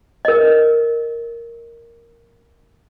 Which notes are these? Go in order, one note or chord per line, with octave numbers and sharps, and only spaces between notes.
A#4 D#5